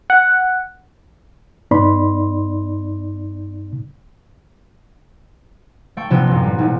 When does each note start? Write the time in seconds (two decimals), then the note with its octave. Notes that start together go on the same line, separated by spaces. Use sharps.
0.10 F#5
1.71 G2 B3 D#4 D5 B5 C6
5.97 A3 G5 C#6
6.10 A#1 C3 F3 B3 G5 E7
6.27 A1 F#2
6.44 G3
6.58 E1 D#4